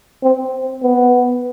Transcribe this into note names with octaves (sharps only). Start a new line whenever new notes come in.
C4
B3